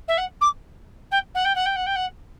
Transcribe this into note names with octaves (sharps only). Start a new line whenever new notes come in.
E5
F#5
D6
G5
F#5
G5
F#5
G5
F#5
G5
F#5